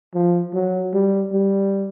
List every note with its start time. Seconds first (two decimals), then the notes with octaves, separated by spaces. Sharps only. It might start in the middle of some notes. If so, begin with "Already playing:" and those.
0.14 F3
0.54 F#3
0.94 G3
1.33 G3